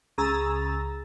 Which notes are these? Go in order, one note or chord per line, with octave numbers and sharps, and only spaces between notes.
C#2 G#4 A#5 E6 A6